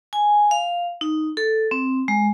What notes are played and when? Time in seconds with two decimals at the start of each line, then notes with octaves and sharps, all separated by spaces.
0.13 G#5
0.51 F5
1.01 D#4
1.37 A4
1.71 C4
2.08 G#3